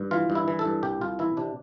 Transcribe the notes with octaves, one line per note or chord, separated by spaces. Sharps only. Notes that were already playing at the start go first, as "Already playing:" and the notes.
Already playing: G2
E3 F4
G2
E4
E3
A4
G2
C2 G4
C2 F4
E3 E4
C3 D4